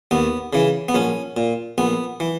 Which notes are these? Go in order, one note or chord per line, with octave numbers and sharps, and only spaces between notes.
D#2 B3
C#3 E3
B3
A#1 C#4
A#2
A#1 B3
E3